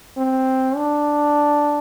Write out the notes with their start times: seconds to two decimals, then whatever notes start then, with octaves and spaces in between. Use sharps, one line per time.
0.17 C4
0.76 D4